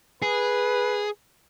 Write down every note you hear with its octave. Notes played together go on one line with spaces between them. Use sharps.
G#4 B4